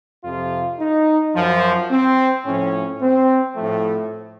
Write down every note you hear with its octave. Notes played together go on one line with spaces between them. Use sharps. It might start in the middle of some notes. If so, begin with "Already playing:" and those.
F2 C3 F3 F4
D#4
F#2 F3
C4
A2 F3 C#4
C4
A2 F3 A3